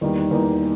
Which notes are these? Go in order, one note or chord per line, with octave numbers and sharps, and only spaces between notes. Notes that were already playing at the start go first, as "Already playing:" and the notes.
E2 D#3 G3 A#3 D#4
E2 D#3 G3 A#3 D#4